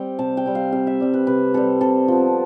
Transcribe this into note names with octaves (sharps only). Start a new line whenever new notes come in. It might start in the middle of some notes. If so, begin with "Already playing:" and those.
Already playing: G3 C4 G5
C3 A5
G5
G3 C4
F5
C3 F5
E5
G3 C4
B4
C3 B4
G3 C4 A4
C3 A4
F3 B3